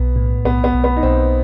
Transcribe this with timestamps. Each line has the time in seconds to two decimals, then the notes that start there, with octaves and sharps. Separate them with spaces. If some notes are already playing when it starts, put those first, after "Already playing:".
Already playing: B1 B3
0.16 A2
0.45 B1 B3
0.64 B3
0.73 B1
0.84 B3
0.97 D#4
1.03 B1 C4